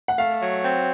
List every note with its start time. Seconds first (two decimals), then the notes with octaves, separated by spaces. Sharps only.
0.08 F#5
0.18 A3 F5
0.40 F#3
0.62 C4